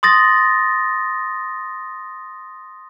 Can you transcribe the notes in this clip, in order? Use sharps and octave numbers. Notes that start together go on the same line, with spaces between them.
C6 D#6 A6 A#6